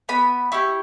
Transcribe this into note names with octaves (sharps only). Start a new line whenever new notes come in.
B3 B5
E4 G4 C#6